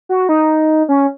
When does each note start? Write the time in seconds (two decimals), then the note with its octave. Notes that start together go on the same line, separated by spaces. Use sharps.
0.09 F#4
0.29 D#4
0.89 C#4